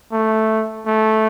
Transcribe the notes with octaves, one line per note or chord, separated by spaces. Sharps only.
A3
A3